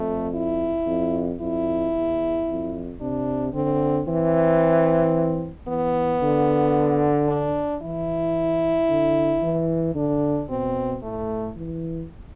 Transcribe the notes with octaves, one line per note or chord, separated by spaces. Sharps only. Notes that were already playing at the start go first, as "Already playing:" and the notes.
Already playing: F2 A3
E4
F2
F2 E4
E2
F2
C3 D4
D3 C4
E3 C4
E3 B3
D3
D4
E3 E4
D3
E3
D3 D4
B2 C4
A2 A3
E3